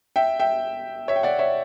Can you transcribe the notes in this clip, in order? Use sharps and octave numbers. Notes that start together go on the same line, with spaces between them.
E5 G5
E5 G5
C#5 E5
G5
D5 F#5
C#5 E5